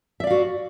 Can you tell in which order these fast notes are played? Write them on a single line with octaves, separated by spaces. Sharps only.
E5 D5 F5 F#4